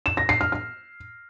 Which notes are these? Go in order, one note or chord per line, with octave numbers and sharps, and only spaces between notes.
E7
A#6
C7
F6
F6